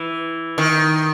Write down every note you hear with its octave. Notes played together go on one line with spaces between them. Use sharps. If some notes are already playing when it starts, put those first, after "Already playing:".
Already playing: E3
D#3